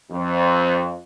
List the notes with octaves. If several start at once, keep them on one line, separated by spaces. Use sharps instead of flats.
F2